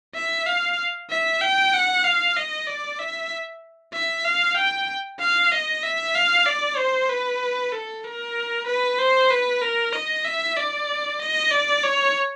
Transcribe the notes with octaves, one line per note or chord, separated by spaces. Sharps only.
E5
F5
E5
G5
F#5
F5
D#5
D5
E5
E5
F5
G5
F5
D#5
E5
F5
D5
C5
B4
A4
A#4
B4
C5
B4
A#4
D#5
E5
D5
D#5
D5
C#5